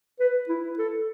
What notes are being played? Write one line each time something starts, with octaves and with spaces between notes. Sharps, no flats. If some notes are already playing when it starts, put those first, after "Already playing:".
B4
E4
A4